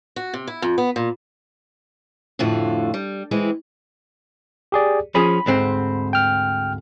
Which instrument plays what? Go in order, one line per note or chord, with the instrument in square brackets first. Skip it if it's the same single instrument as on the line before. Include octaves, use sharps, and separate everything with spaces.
[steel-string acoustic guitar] F#4
C3
E4
F2
B3
A#2
F2 A2 D3 F4 F#4
G3
E3 G#3 C4 E4
[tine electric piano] G4 G#4 D5
[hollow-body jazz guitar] F3 C#4 G#4 [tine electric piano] B5
[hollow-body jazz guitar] D2 G#2 C4
[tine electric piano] G5 F6